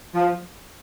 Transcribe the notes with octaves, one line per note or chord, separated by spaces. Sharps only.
F3